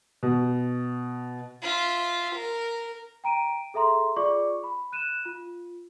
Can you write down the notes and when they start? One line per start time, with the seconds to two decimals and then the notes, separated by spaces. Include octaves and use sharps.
0.23 B2
1.63 F4 E5
2.36 A#4
3.24 G5 A#5 D7 D#7
3.74 G#4 A4 E5 A#5 C6
4.16 F4 G#4 D5 C#6 D6
4.64 B5
4.92 F#6 D#7 E7
5.25 F4